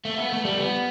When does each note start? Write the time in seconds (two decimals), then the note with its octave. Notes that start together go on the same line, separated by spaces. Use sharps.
0.05 A3
0.18 B3
0.32 A3
0.45 G3
0.58 B3